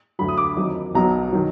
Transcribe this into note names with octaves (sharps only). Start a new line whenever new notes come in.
D2 D3 F#3 B5
D#6
D6
F2 D#3 F#3
B1 B2 F#3 A#5
D#3 F#3